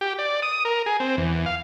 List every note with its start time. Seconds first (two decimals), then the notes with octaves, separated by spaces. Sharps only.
0.01 G4
0.19 D5
0.42 D#6
0.65 A#4
0.86 G#4
1.00 C4
1.17 E2
1.46 F5